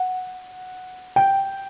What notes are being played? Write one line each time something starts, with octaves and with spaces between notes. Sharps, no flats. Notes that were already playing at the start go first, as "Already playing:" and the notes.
Already playing: F#5
G5